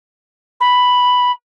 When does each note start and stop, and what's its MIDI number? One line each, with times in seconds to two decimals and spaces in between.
0.60 1.31 83